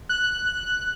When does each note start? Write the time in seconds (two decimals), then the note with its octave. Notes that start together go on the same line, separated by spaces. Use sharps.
0.09 F#6